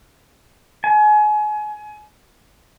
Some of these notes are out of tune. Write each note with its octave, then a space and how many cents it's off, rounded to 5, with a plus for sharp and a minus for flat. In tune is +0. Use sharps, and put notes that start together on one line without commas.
G#5 +30